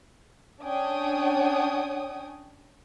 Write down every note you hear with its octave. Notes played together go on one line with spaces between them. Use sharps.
C#4 D4 C#5 G5 G#5 D#6